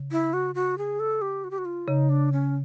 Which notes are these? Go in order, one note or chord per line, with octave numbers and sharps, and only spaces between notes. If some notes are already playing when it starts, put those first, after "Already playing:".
Already playing: C#3
E4
F#4
F#4
G#4
A4
G4
F#4
G4
F#4
F4
C#3 D#4
D4
C#4